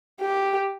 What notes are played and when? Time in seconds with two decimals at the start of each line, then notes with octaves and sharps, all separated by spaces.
0.21 G4